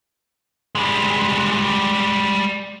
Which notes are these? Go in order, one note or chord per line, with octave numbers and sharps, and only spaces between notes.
G3 G#3